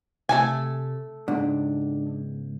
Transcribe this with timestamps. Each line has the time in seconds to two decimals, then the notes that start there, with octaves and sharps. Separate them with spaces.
0.29 C3 A3 A4 G#5
1.28 C#2 G#2 D4